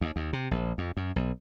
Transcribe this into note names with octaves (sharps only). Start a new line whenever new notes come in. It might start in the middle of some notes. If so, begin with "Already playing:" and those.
D#2
D#2
C3
A#1
F2
F#2
B1